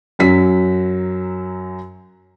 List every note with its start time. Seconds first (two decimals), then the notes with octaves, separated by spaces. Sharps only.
0.19 F#2 F#3 B6